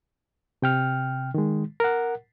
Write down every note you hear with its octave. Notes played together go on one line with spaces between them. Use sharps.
C3 G5 F6
D#3 G#3
A#4 F#5